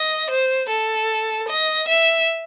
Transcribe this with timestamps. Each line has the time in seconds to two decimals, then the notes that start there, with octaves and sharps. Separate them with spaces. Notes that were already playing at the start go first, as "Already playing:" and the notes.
Already playing: D#5
0.30 C5
0.69 A4
1.48 D#5
1.88 E5